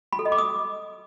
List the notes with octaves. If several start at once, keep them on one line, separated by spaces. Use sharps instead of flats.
B5
A4
D#5
D6
D#6